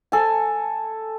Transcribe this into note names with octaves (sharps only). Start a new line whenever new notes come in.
A4 G#5